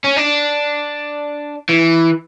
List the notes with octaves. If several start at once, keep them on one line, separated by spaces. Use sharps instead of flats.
C#4
D4
E3